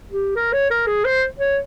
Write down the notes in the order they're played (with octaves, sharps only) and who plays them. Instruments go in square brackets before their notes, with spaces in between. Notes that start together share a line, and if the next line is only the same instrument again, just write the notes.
[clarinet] G4
A#4
C#5
A#4
G#4
C5
C#5